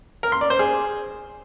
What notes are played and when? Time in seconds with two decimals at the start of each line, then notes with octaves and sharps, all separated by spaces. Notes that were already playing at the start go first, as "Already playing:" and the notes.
0.23 A#4
0.32 C6
0.41 D5
0.50 C5
0.59 G#4